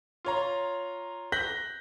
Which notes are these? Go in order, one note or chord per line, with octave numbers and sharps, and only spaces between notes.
F4 C#5 A#5
F#6 G6 A#6 B6 F#7 G7